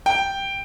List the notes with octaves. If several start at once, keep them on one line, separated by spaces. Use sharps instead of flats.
G5